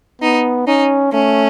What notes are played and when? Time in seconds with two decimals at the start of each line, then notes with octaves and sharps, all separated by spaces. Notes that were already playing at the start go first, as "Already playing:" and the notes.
0.22 B3 D#4
0.67 C#4 D#4
1.12 A3 C#4